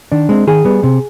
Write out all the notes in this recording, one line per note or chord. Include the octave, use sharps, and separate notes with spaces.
D#3 D4
G#3 C4
D#3 G#4
G3 B3
C3